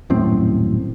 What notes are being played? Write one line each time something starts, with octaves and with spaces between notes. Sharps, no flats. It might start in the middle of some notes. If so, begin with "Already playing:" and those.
D#1 F#2 A2 C4